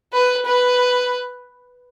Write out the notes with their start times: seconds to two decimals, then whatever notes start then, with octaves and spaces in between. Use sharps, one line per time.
0.13 B4
0.46 B4